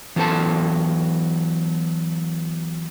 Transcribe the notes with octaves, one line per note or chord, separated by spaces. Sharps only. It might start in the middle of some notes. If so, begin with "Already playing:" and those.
E3 F#3 B3 A4 A5